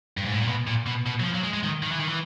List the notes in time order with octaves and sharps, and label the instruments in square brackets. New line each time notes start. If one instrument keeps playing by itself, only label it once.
[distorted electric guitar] G2
G#2
A2
A#2
B2
A#2
B2
B2
F#3
F3
F#3
G#3
G#3
D#3
D#3
E3
D#3
E3